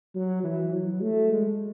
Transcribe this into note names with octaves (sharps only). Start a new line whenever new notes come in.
F#3
E3
F#3
A3
G#3